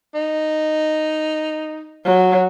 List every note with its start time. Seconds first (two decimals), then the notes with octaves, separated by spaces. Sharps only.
0.14 D#4
2.05 F#3